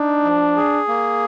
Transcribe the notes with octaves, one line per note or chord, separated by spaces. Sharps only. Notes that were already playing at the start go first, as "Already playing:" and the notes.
Already playing: D4 D#4
F3
G#4
A#3